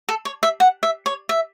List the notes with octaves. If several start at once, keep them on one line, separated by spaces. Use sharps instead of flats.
A4
C#5
E5
F#5
E5
C#5
E5